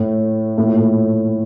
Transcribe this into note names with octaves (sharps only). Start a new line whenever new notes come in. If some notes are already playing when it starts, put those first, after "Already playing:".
Already playing: A2
A2
A#2
A2